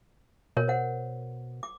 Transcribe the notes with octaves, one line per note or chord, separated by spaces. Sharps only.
B2 A#4 C#5
C5 F#5
D6